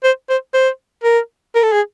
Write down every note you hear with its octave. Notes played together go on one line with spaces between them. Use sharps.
C5
C5
C5
A#4
A#4
A4
G#4